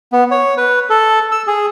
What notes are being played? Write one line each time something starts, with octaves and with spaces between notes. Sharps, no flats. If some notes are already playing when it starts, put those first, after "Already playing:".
B3
C#5
B4
A4
E6
G#4